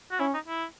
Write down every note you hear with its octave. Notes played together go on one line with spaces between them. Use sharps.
F#4
C#4 E4
D#4
E4